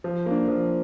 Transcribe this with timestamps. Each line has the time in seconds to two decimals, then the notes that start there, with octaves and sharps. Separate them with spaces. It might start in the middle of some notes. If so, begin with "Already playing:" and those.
0.04 F3
0.26 A#3 D4
0.48 F3